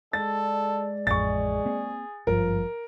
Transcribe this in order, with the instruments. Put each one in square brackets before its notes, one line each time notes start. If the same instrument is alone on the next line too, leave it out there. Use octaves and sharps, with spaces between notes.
[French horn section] G#3 D5 [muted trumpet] A4 [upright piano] A6
[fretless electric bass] A1 F2 [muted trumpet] G#4 [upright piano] C#6 A6
[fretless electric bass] A#3 C4
[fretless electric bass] G#1 G2 [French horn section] F3 [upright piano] A#4